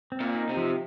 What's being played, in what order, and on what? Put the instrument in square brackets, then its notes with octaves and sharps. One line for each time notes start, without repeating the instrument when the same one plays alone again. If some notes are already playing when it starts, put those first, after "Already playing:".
[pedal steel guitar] C4
[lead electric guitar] A#2
[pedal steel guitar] D#4
[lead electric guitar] C3
[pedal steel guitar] F3